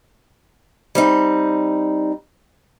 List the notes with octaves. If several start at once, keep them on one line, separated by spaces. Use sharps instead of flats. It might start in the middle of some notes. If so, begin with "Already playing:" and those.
G3 C4 D#4